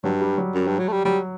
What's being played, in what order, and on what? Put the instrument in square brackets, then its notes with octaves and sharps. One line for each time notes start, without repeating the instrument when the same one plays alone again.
[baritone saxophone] G2 [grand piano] F#3
[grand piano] G3
F#3
[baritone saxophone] F#2
G2
F#3
A3
G3
[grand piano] F#3 [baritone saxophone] G3